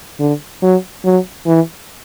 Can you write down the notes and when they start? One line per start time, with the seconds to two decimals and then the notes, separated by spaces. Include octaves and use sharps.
0.20 D3
0.62 F#3
1.05 F#3
1.47 E3